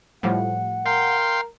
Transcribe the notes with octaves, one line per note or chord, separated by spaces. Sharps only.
A2 F3 G3 F#5
A#4 F5 G5 C6